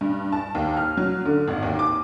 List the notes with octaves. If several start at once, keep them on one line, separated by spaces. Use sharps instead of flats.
G2
A5
D#2
F6
F#3
D3
G#1
D#2
D6